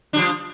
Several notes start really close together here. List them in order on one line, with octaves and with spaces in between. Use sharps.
D4 G3 F3